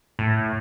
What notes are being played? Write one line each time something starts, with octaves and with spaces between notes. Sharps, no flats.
A2